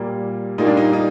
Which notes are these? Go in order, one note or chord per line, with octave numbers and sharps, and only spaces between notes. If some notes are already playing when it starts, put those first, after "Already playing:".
Already playing: A#2 G3 A#3
A#2 G3 A#3 D#4
D4
D#4
D#4